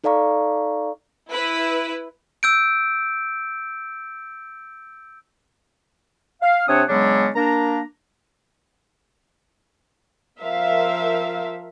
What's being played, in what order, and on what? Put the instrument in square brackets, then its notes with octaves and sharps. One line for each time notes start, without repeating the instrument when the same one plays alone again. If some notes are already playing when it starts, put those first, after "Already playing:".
[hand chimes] D#4 A4 D5 F5 A#5 C#6
[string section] E4 B4
[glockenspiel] E6 G6 D7
[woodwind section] F5
C3 C4 D4 C#5 F#5 D#6
C#3 F#3 G#3 B3 C#4 D4
A#3 D4 A#5
[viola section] F3 A#4 E5 F5